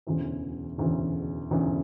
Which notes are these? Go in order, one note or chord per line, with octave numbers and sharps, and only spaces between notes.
E1 D2 C#3 E3
E1 D2 C#3 E3
E1 D2 C#3 E3